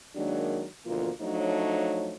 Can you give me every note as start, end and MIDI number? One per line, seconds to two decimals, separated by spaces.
0.15 0.66 51
0.15 0.66 54
0.15 0.66 56
0.15 0.66 58
0.15 0.66 62
0.86 1.10 38
0.86 1.10 47
0.86 1.10 52
0.86 1.10 53
0.86 1.10 58
0.86 1.10 65
1.21 2.16 53
1.21 2.16 54
1.21 2.16 57
1.21 2.16 62
1.21 2.16 63
1.21 2.16 73